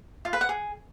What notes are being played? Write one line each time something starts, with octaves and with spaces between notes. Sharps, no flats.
F4
B4
F#5
G#4